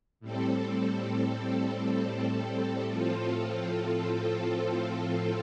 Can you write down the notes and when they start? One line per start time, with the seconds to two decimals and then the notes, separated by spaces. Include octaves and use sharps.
0.20 A2 G3 C4 A4
2.89 A2 F3 C4 F4 A4